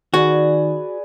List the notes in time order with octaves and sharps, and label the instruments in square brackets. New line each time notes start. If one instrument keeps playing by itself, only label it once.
[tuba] D#3 [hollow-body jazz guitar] F#4 [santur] G#4 B4 D5